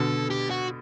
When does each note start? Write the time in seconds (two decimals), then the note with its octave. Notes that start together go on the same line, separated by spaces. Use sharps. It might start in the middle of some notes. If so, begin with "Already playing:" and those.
Already playing: B2 D3 A4
0.30 G4
0.50 F#4